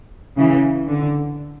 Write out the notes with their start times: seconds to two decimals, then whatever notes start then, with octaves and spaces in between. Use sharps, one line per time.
0.38 C#3 E3
0.89 D3